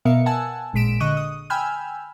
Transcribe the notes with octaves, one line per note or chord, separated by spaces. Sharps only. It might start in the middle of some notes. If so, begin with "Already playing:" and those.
B2 B3 A#4 E5 F5 C#7
F#5 G#5 A5 E6
A1 A#2 G#3 B6 D7 E7
D3 D#5 C#6 F#6 D#7
D#6
G5 G#5 B5 E6 F6 G6